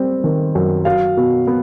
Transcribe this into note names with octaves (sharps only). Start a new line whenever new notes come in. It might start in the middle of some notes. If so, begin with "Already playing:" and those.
Already playing: G3 C4
D#3
F#2
F#3 F5
B2
B3